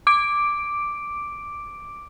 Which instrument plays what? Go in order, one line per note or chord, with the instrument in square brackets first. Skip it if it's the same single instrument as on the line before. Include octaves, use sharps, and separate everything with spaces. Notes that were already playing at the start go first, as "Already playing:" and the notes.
[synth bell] D6 D7